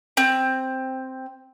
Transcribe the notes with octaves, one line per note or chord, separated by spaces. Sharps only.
C4